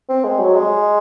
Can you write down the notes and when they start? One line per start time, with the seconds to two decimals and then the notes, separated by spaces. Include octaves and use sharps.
0.09 C4
0.24 G#3
0.40 F#3
0.55 G#3